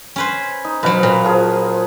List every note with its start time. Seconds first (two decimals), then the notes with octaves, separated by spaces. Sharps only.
0.16 C#4 B4 C5
0.65 D#4
0.83 B2 F#3 B4 C5 F5
1.03 A#2
1.25 F3 G#4